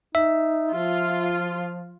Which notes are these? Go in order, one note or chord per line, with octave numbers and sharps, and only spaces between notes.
D#4 E5
F3 F4